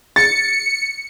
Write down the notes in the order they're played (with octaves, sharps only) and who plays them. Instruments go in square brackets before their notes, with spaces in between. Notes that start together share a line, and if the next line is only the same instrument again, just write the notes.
[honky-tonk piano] A6 [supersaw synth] C#7